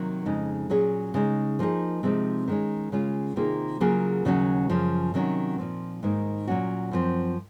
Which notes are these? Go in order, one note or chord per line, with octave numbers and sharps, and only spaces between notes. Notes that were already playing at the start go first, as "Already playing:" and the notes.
Already playing: C3 D#3 F#3 A#3
F2 C#3 G#3 D#4
A#2 F#3 C#4 G#4
C#3 G#3 D#4
F3 A#3 D#4 G#4
C3 F3 G#3 C4 D#4
D#3 G#3 C#4
C#3 G#3 C#4 F4
C3 D#3 A#3 F4 G#4
C#3 F#3 A#3 F4 G#4
D#2 C#3 F#3 C#4 F#4
F#2 C#3 F3
C3 D#3 F#3 C#4 F#4
A#2 F3 C4
G#2 D#3 A#3 D#4
A#2 F#3 C#4 F#4
F#2 F3 C4